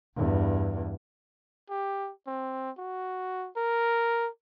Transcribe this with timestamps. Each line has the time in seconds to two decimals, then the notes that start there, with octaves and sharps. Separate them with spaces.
0.16 E2 G2
1.70 G4
2.27 C4
2.78 F#4
3.57 A#4